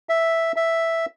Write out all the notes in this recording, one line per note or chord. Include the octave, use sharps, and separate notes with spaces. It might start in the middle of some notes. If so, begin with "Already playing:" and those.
E5
E5